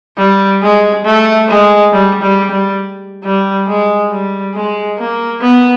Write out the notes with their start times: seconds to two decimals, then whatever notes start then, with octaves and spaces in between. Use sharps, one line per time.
0.17 G3
0.62 G#3
1.04 A3
1.48 G#3
1.92 G3
2.22 G3
2.51 G3
3.24 G3
3.67 G#3
4.10 G3
4.54 G#3
4.98 A#3
5.41 B3